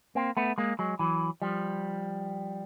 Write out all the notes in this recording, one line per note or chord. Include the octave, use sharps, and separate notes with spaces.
A#3 C4
A3 B3
G#3 A#3
F#3 G#3
E3 F#3
F3 G3